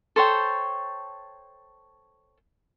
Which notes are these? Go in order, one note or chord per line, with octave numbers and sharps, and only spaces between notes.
A4 C5 C#5 G5